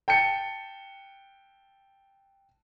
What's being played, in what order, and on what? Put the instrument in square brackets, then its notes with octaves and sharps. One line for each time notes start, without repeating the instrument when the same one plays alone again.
[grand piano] G5 A5 G6 C#7